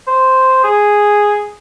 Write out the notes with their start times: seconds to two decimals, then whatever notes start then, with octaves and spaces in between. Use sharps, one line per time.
0.07 C5
0.64 G#4